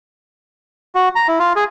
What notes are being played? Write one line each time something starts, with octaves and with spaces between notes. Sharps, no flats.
F#4
A#5
E4
F4
G#4